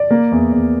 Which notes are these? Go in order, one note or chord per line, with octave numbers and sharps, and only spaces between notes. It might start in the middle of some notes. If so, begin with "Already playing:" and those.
Already playing: D5
A#3
E2
E2